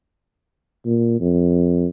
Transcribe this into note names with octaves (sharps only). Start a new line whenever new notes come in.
A#2
F2